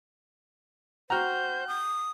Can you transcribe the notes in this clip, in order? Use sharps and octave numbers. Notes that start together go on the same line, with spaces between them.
F#4 C5 F#5 G5 A#5 F6 G6
D#6